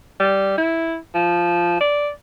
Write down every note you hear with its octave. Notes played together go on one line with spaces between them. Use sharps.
G3
E4
F3
D5